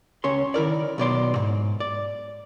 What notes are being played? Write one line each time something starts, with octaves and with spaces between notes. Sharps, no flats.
C#2 C#4 C#5 C6
D#3 E4 A#4 D5
B1 B2 D5 C6
G#2
D5